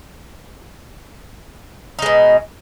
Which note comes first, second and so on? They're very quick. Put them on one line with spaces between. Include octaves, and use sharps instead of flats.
D#4 G#3 B2